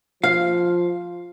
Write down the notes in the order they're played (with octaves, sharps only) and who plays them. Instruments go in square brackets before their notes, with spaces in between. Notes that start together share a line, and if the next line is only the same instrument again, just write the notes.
[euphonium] F3 [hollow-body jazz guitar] F5